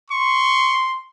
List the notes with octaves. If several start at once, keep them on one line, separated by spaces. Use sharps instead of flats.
C6 C#6